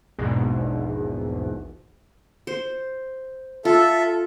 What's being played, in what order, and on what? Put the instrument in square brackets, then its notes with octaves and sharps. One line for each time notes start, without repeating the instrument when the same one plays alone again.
[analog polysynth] A#1 E2 G#2 B2
[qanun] C5
[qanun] F4 [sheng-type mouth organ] A4 E5